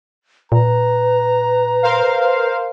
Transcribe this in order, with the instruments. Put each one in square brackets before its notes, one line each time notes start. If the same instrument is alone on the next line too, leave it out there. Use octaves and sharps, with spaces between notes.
[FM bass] A#2 [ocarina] B4 [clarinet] A#5
[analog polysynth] A#4 C5 F5